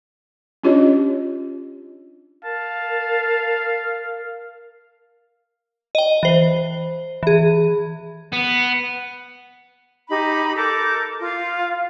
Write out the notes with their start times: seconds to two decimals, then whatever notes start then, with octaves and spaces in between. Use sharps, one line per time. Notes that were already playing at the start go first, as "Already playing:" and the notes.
0.64 C#4 D4 F4 G4 C#5 D#5
2.44 A#4 F5 A5
5.95 D#5 G5
6.23 E3 C5
7.23 E3 G#4
8.33 B3
10.10 D#4 G4 B5
10.56 A4 A#4 D6 G6
11.20 F4 F5